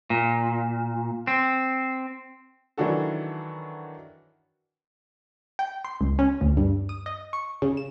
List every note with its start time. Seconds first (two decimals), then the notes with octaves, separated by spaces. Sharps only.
0.10 A#2
1.27 C4
2.78 D#3 E3 F#3 D4 F#4 A4
5.59 G5
5.85 C6
6.01 C#2
6.19 C#4
6.41 D2
6.57 G2
6.89 D#6
7.06 D#5
7.33 C#6
7.62 C#3
7.77 E7